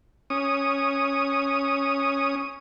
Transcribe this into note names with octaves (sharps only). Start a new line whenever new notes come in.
C#4 D#6